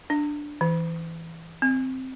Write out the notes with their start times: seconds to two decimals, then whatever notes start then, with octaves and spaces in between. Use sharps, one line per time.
0.10 D4
0.61 E3
1.62 C4